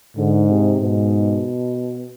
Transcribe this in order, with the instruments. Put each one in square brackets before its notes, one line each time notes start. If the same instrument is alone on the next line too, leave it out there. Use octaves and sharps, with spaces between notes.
[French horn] G#2 [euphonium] D3
[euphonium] C3
[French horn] G#2 [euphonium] B2